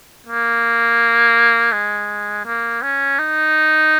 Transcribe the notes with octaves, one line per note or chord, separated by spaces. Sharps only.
A#3
G#3
A#3
C#4
D#4